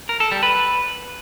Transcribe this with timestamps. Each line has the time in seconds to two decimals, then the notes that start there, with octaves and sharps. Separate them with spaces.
0.09 A#4
0.20 A4
0.31 G3
0.43 B4